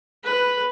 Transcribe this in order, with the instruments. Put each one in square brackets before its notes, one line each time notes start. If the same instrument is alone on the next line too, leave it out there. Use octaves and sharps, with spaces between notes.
[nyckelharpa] B4